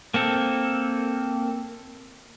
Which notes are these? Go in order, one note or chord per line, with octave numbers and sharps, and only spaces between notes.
A#3 C4 A4